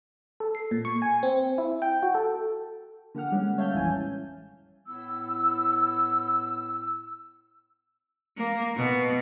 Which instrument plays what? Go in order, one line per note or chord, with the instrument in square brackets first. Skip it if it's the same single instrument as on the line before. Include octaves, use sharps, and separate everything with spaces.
[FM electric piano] A4
C7
A#2
C#6
G#5
C4
E4
G5
F#4
A4
[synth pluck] D3 A#3 G4 F#5 F6
G3 G#3 C#4
C#5 E5 F5 A5 G6
A1 F2 E3 G#5
[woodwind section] A2 B3 E4 E6
[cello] A#3
B2